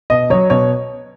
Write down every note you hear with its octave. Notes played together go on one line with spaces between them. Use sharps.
B2 D#5
F#3 C#5
B2 C#5